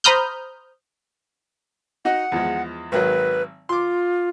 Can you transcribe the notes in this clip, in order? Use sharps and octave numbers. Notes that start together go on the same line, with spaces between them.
C5 A#5 B5 D#6 F6 G6
D#4 F#4 D#5 F#5
E2 F3 G#3
G#1 D#3 F#3 B4
F4 C6 D6